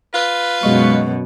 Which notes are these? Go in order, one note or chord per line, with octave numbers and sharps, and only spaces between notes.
F4 B4
F#2 B2 G#3 D#5 C#6